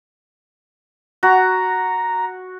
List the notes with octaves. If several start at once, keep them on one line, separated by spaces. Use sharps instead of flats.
F#4 A#5